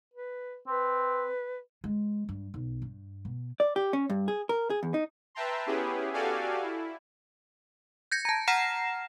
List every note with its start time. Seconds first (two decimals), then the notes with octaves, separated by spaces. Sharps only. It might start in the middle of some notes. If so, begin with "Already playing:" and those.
0.14 B4
0.67 C4 B4
1.84 G#3
2.29 G2
2.54 B1
2.82 G2
3.25 B2
3.60 D5
3.76 G4
3.93 C#4
4.10 G2
4.28 G#4
4.49 A#4
4.70 G#4
4.83 E2
4.94 D#4
5.35 B4 E5 G5 A5 A#5 C6
5.66 B3 C#4 E4 G4 G#4 B4
6.13 F#4 G4 A4 D5 F5 G#5
6.62 E4
8.12 G6 G#6 A#6 C#7
8.25 A5 A#5
8.47 F#5 A#5 F6 A#6 C7 E7